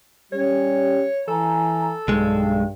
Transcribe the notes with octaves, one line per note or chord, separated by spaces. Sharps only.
G3 C#4 G4 C#5
E3 A4 G#5 A#5
B1 G2 G#3